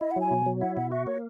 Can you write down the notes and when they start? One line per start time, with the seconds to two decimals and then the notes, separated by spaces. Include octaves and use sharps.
0.01 E4 D#5
0.11 F#5
0.16 F#3 G#5
0.31 B2
0.46 F#3
0.61 E4 F#5
0.76 B2 F#5
0.92 F#4 E5
1.07 A#3 C#5